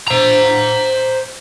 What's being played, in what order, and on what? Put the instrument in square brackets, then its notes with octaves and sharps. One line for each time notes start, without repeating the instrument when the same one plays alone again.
[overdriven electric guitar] C5 A#5